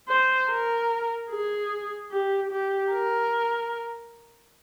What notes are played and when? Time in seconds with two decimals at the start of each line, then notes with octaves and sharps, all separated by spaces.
0.09 C5
0.50 A#4
1.30 G#4
2.11 G4
2.51 G4
2.92 A#4